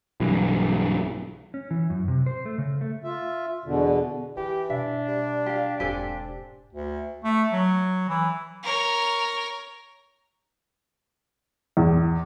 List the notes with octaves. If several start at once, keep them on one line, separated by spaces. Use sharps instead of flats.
B1 G2 E3
C#4
E3
F#2
C3
C5
A3
C#3
A3
F4 E5
E2 B2 D3
E3 E4 G4
B2 D4 E5
G3
G4 F5
E1 G#2 C4 G4 A4 G#5
D2
A3
F#3
E3
A#4 C#5
E2